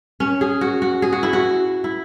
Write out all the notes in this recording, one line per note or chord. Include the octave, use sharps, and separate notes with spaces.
C#4
G#4
F#4
F#4
G#4
F#4
E4
F#4
E4